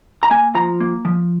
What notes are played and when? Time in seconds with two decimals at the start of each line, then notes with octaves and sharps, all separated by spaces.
0.23 A#5
0.31 A#3 G#5
0.55 F3 A#5
0.80 A#3
1.05 F3